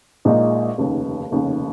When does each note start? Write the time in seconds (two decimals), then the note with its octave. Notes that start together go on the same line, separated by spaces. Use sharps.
0.25 A#1 A#2 G#3 D#4
0.78 F1 D#2 C#3
1.31 F1 D#2 C#3